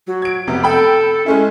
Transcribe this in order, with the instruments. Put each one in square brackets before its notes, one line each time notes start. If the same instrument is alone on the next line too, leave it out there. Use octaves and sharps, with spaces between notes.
[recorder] F#3
[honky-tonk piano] G#6 D7
[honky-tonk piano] F1 C3 [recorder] B3
[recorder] A4 [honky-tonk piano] G5 B5
[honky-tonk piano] G#3 A3 E4 [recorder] C#4